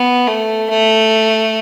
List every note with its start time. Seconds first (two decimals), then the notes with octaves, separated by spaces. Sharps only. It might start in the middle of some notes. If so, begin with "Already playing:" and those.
Already playing: B3
0.28 A3
0.70 A3